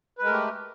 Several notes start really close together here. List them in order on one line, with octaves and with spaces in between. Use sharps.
B4 G#3 A#4 A3 G4